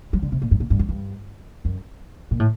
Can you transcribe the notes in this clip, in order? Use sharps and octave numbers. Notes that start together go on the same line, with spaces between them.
F#3
D3
C3
A#2
G2
A#2
G2
F#2
G2
F#2
A#2
A2